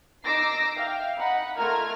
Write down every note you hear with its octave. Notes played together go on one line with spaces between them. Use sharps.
D#4 D6 E6 A#6 C7
E5 F5 G5
D#4 F#5 B5
A3 F4 A#4 A#5 F6 G#6